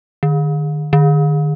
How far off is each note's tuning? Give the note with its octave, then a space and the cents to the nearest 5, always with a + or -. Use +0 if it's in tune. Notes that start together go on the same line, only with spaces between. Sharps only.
D#3 -45
D#3 -45